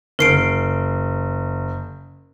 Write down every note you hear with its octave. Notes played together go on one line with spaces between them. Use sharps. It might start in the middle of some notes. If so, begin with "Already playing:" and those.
F#1 A#4 C7 D7